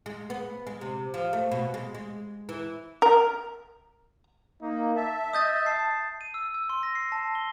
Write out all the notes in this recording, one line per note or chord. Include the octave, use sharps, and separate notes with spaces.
G#3
B3
G#3
C3
F3
A3
B2
G#3
G#3
E3
A#4
A#3 D#4
E5 A5
D#5 D#6 G6 A6
A5 C7
D#7
E6
E6
C6
A#6
C7
A5
G7